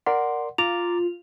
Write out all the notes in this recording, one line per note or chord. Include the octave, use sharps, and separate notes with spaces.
A#4 D5 F#5 C6
F4 A#5 D6 A6 F7